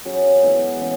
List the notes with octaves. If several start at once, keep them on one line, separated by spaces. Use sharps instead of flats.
F#3 C#4 G#4
E3 G#3 B3 E4
C#3